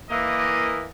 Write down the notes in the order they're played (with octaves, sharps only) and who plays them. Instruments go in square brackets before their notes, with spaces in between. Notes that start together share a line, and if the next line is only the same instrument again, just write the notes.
[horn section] E3 A#3 D#5